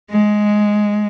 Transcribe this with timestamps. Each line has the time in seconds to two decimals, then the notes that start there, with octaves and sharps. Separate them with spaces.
0.11 G#3